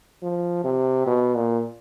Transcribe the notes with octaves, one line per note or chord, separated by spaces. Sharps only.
F3
C3
B2
A#2